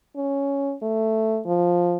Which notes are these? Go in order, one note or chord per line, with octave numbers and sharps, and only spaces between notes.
C#4
A3
F3